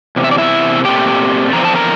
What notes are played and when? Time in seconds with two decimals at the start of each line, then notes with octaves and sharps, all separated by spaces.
0.16 E2 C3
0.24 E5
0.31 D5
0.38 E4 E5
0.84 A#2 A3 C4 G4 G5
1.53 E2 D3 F3 C4 A#5
1.65 A5
1.75 A#4 A#5